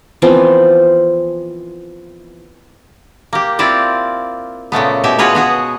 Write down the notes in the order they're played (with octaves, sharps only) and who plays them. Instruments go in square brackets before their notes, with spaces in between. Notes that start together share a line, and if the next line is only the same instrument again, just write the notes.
[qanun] E3 F3 B3 C4
[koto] A#3 G4
C4 E4 F4 D5
A#2 C#3 A3 B3
B2 E4 G4 E5
F4 F#4 G#4 B4 C#5
B3 F#4 G#4